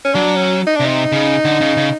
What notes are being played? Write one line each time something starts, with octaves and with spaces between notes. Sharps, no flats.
C#4
F#3 D4
C#4
D#4
D4
C3
D#4
C#3
D3
C#3
C#3